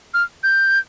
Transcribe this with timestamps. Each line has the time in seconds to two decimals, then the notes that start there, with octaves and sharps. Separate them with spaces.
0.14 F6
0.44 G6